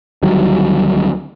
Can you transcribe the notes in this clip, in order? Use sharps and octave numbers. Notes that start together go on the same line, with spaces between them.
D2 D#3 F#3 G3